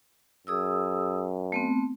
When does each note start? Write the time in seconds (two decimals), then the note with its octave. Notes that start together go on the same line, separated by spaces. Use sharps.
0.47 F#2 G#4 D#6 E6
1.52 A3 B3 C4